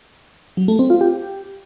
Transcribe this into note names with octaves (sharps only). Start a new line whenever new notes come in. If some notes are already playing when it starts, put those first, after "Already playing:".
F#3
A3
C4
F4
G4